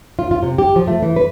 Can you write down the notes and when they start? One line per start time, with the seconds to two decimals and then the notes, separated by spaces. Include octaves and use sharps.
0.19 F4
0.31 F4
0.43 C3
0.58 G4
0.76 F3
0.87 A3
1.02 E3
1.16 B4